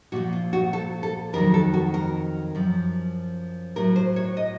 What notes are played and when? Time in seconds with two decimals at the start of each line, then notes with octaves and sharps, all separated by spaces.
0.12 A#2 F3 F#4
0.32 F4
0.53 F#4
0.73 A4
1.03 A4
1.33 F2 D#3 F#3 A#4
1.54 A4
1.74 F#4
1.94 A#4
2.55 F#2 F3
3.76 A2 F#3 A#4
3.96 C5
4.16 C#5
4.37 D#5